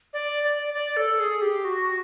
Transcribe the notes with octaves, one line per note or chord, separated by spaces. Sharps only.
D5
D5
D5
A4
G#4
G4
F#4